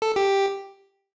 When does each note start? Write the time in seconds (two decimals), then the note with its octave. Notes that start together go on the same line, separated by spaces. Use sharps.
0.02 A4
0.16 G4